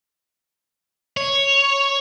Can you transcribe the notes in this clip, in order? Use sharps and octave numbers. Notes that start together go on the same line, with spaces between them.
C#5